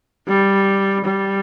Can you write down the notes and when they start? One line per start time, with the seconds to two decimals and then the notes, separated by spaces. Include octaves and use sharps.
0.28 G3
1.05 G3